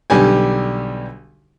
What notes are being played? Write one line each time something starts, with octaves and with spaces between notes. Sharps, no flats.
B1 D3 G3 G4 G#5